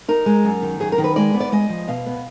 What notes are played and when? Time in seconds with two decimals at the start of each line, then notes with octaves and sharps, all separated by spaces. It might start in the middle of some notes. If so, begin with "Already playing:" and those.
0.08 D#4 A#4
0.26 G#3
0.44 F#2
0.62 D#3
0.80 F#2 G#4
0.92 A#4
0.98 D#3
1.04 B4
1.16 G#3 D5
1.34 B3
1.40 D5
1.52 G#3 D#5
1.70 F3
1.88 B2 F5
2.07 B3